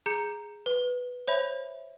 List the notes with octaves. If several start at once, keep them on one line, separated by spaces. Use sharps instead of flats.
G#4 A#5 G6 C#7
B4
C5 C#5 E5 B5